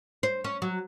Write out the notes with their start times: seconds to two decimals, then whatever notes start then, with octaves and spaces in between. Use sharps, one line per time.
0.23 C5
0.44 C#4
0.62 F#3